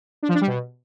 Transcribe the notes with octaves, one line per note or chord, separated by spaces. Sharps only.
D4
F3
D4
G3
B2